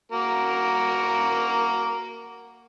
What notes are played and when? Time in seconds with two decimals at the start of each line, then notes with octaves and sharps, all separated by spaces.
0.12 A#3 F#4 A#4